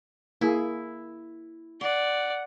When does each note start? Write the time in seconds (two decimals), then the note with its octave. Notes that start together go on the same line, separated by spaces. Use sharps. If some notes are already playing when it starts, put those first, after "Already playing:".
0.41 A#3 E4 G#4
1.81 D5 F#5 C6